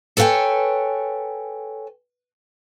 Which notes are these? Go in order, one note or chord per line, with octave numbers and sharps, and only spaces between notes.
A4 B4 C#5 E5 G5 G#5